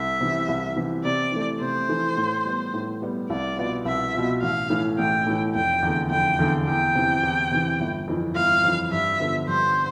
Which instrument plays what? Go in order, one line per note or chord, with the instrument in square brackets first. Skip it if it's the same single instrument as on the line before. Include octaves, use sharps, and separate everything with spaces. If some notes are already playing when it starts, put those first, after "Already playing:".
Already playing: [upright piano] C2 [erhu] E5
[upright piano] C3 E3
C2
C3 E3
[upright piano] C3 [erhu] D5
[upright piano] E3 A3
[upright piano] C3 [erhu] C5
[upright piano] E3 A3
A2
G3 B3
A2
G3 B3
[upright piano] C2 [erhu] D5
[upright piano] B2 B3 F4
[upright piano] C2 [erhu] E5
[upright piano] B2 B3 F4
[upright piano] A1 [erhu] F5
[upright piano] A2 E3
[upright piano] A1 [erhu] G5
[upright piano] A2 E3
[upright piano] F1 [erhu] G5
[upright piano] E2 D3
[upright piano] F1 [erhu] G5
[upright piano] E2 D3
[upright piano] E2 [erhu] G5
[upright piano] C3 E3
E2
C3 E3
G1
F2 E3
[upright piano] G1 [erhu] F5
[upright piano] F2 E3
[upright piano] G2 [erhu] E5
[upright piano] D3 F3 B3
[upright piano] G2 [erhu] C5